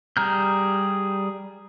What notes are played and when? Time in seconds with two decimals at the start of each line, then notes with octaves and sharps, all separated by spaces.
0.17 G3 G#4 A#5 F6 G6